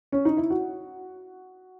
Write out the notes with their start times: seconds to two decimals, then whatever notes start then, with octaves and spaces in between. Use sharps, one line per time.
0.12 C#4
0.25 D#4
0.37 E4
0.50 F#4